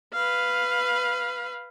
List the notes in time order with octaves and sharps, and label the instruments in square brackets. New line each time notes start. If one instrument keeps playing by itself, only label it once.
[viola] B4 F5